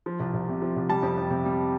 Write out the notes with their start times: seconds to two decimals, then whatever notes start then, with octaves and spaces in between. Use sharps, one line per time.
0.06 F3
0.20 C2
0.34 C2
0.48 C3
0.62 F3
0.76 C2
0.89 G3 A5
1.03 F2
1.18 F2
1.30 C3
1.45 G3